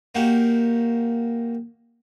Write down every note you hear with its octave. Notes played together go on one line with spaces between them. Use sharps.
A#3 D#4 F#4 G4